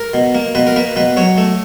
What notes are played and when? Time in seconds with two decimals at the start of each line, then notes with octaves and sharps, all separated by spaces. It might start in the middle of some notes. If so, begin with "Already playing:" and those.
Already playing: A#4
0.14 B2
0.35 A#3
0.55 B2 B4
0.67 A#4
0.76 A#3 B4
0.96 B2 B4
1.17 F#3 C#5
1.38 A3